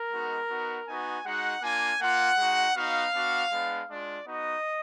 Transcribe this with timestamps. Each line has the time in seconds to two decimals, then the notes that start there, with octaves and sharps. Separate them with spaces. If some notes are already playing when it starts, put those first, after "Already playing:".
Already playing: A#4
0.12 G#3 B3 D#4 F#4
0.49 B3 D#4 F#4
0.87 B3 D#4 F#4 G#5
1.26 G#3 D#4 F#4 F#5
1.62 A#3 D4 F4 G#5
2.01 A#3 F4 F#5
2.38 G#3 D#4 F#4
2.76 B3 D#4 F#4 F5
3.14 B3 D4 F#4
3.51 G#3 B3 D4
3.89 G#3 D4 F4 D5
4.27 B3 D#4 F#4 D#5